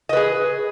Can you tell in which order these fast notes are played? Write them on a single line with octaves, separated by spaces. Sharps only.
D#5 B4 G#4